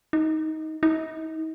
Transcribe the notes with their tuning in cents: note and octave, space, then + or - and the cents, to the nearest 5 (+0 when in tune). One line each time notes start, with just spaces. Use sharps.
D#4 +15
D#4 +40